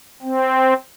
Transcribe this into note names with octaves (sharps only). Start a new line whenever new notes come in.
C4